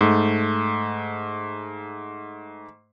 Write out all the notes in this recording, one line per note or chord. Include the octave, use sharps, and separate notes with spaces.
G#2 A3